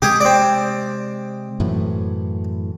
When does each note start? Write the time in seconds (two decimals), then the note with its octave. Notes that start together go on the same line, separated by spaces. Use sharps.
0.02 C3 G#3 G4 G#4
0.21 C4 D5
1.60 F#2 A2 E3